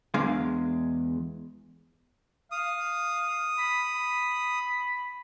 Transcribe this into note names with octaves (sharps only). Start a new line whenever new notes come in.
E2 G#3 D4 F5
F5 D#6
B5
B5